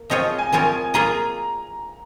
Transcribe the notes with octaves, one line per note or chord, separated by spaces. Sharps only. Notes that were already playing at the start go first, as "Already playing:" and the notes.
Already playing: A#3
F3 C4 F4 G#4 C#5 D#5
G#5
F3 C4 F4 A#4 C#5 G#5
A#3 F4 G#4 D#5 A#5